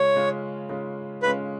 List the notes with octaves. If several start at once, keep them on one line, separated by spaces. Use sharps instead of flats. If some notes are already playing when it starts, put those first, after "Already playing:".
Already playing: C#3 G#3 C#4 F4 C#5
C#3 G#3 C#4 F4
C#3 G#3 C#4 F4
C#3 G#3 C#4 F4 B4